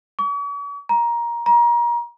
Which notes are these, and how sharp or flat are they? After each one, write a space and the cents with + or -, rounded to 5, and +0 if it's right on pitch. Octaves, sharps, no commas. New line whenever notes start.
C#6 +45
A#5 +15
A#5 +30